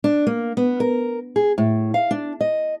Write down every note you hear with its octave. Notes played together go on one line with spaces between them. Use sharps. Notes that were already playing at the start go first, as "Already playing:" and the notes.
D4
A#3
B3
A#4
G#4
A2
F5
D4
D#5